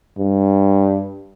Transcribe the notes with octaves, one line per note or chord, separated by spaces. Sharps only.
G2